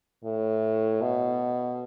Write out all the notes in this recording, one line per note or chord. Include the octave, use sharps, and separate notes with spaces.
A2
B2